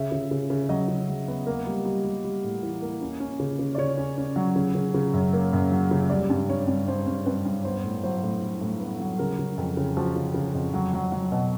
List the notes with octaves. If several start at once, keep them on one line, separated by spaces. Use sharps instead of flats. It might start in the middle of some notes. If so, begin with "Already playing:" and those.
Already playing: C#3 E5
C#3
C#3
C#3
F#3 D#5
C#3
F#3
B3
A#3
G3
G3
G3
G3
A2
E3
A#3
C#4
C#4
C#3
C#3
D5
C#3 C#5
C#4
C#4
F#3
C#3
C#3
C#3
F#2
A#3
F#2
F#3
C#3
G3 D5
G2
G2 C#5
G2
G2 C5
G2
G2 B4
G2
B3 C5
A2
F#3 C5
A2
A2
A2
B3
F#3
C#3 A#4
C#3
F2
C#3
F3 F#4
C#3
C#3
F2
F#3
F#3
F#3
B2